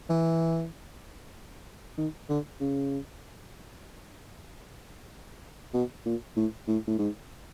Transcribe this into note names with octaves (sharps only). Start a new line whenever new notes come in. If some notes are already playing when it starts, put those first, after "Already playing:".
E3
D#3
D3
C#3
B2
A#2
A2
A2
A2
G#2